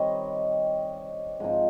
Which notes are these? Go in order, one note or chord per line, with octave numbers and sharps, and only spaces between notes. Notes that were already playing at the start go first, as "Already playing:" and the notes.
Already playing: D#3 G3 C4 D#4 C#5 D#5
G#2 F3 C4 D#4